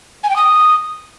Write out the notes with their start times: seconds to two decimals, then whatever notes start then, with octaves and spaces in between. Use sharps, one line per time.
0.23 G#5
0.29 G5
0.36 D#6